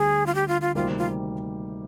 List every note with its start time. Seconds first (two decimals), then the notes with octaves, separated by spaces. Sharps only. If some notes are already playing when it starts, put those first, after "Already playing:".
Already playing: D2 D3 G3 G#4
0.26 F4
0.35 G4
0.48 F4
0.61 F4
0.75 D2 C3 D#3 G3 A#3 F4
0.98 F4